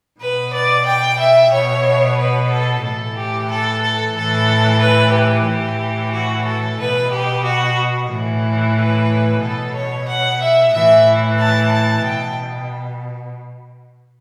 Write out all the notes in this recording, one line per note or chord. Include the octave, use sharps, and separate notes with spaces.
B2 B4
D5
G5
E5
B2 C#5
B4
A4
A2 E3 A4
G4
A4
A4
A2 E3 A4
B4
G4
A2 E3
F#4
A4
B2 B4
G4
F#4
A2 E3
B4
B2 A4
C#5
F#5
E5
A2 E3 E5
A5
A5
B2 G5